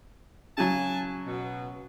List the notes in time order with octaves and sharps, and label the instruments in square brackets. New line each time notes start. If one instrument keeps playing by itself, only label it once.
[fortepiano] C#3 F#3 [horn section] G#5 A5
[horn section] B2